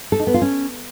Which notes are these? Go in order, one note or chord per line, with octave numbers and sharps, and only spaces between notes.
A4
D#4
B3
F4
C#4